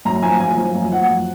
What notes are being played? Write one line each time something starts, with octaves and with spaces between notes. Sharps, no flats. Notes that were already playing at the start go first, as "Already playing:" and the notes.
F#2 A#5
F3 G#5
F#2 G#5
F3
F#2
F3 F#5
F#2